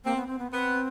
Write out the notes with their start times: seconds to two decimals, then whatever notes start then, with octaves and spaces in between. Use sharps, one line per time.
0.04 A#3 C4
0.16 B3
0.27 C4
0.39 B3
0.51 B3 C4